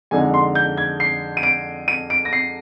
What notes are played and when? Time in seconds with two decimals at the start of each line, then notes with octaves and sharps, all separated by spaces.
0.11 F2 D3 G#3 D#4 G#5
0.34 C6
0.55 G6
0.77 G#6
1.00 C7
1.37 D#7
1.43 D7
1.88 D#7
2.10 D7
2.25 A#6
2.33 C7